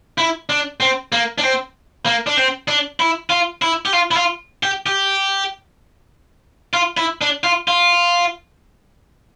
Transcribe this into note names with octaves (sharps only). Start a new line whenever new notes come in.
E4
D4
C4
A#3
D4
C4
A#3
D4
C4
D4
E4
F4
E4
G4
F4
E4
F4
G4
G4
F4
E4
D4
F4
F4